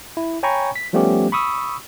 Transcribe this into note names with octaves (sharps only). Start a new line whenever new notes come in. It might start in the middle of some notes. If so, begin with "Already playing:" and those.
E4
C#5 G5 G#5 A#5 B5 C#6
B6
F3 G3 A3 B3 C#4 G4
B5 C#6 D#6 E6